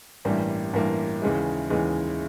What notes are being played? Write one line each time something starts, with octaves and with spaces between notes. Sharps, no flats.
A1 G2 E3 G3 A#3
A1 G2 E3 G3 A#3
D#2 C#3 E3 G#3
D#2 C#3 E3 G#3